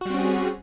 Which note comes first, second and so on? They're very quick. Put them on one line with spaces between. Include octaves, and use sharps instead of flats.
F#4 G3 C4 C#4 G#4